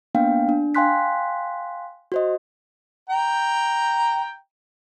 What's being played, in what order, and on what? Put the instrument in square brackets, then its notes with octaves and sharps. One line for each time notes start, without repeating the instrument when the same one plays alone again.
[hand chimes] A#3 B3 D4 F5 G5
D4
F5 G5 G#5 C6 F#6 B6
F#4 C5 D#5
[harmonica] G5 A#5